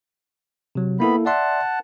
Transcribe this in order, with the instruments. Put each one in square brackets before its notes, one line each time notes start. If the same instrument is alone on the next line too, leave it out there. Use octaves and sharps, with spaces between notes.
[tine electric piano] C3 F#3
[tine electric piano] A#3 E4 A4 [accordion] B3 B5
[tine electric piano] D5 E5 C6 [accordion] F#5 A5